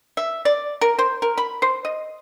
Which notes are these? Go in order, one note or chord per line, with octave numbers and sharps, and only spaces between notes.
E5
D5
A#4
C5
A#4
B5
C5
D#5